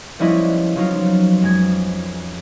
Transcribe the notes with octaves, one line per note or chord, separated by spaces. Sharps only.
F3 G3 B3 C#4 E4 D#5
F3 F#3 D#4 F4
F2 G#3 G#6